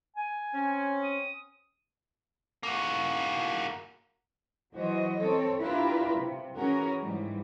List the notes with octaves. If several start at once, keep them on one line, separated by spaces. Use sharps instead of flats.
G#5
C4 C#4
D#6
A#3 F#4
E3 F#3 F#4 C5 D#5
C4 A4 C#5
D4 E4 F4 G4 A#4 B4
C3
E3 C#4 F#4 G#4 A#4 C#5
G#2 E3 G3